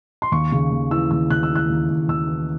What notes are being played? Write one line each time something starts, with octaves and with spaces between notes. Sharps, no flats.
C6
D#2 C#6
C#3
D#2
E3 E6
D#2 E6
C#3 F#6
E6
E3
F#6
D#2
D#2
D#2 E6
E3